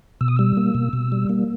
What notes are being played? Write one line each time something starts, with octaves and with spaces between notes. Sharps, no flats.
B2 E6
D#6
G3 E6
A#3
B2
B2
G3
A#3